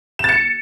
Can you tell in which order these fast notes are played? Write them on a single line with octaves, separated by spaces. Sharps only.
E7 A6 C#7